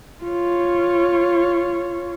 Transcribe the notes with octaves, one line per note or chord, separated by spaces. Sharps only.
F4 C#5